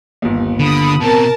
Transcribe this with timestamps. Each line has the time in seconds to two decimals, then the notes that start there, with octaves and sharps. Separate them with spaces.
0.22 G1 D#2
0.59 D3 B5 D#6
1.01 B2 C4 A#4 A5